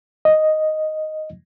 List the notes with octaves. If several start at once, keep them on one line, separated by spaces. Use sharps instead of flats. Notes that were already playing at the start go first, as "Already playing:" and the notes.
D#5